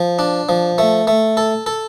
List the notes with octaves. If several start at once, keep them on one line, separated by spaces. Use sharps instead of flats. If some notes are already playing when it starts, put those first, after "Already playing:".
Already playing: F3
D4
F3
A3
A3
A4
A4